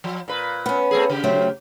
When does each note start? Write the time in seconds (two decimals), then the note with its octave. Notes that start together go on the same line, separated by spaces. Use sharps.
0.04 F3
0.28 A#2 B4
0.66 B3 C#4
0.91 A3 C4 G#4
1.10 C#3 G4
1.24 F#3 A3 C4